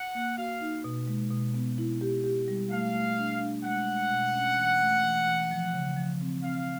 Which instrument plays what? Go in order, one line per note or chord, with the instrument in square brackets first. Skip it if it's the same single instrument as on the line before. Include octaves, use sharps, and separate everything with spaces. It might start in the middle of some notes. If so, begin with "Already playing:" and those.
Already playing: [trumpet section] F#5
[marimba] A#3
[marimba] F#4 [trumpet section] F5
[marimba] D#4
B2
G#3
B2
B3
E4
G4
G4
G3
[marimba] A3 [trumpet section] F5
[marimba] A3
D4
D4
[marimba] G#3 [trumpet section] F#5
[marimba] G#3
B2
C#4
E3
A3
E3
E3
F3
C#3
F3
C4
[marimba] C4 [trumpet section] F5